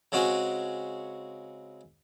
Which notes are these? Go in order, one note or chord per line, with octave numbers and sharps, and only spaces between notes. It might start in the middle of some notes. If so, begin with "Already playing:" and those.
C#3 G#3 C4 C#4 F#4 G#4